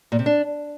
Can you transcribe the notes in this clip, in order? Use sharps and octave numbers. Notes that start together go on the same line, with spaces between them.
A#2
C3
D4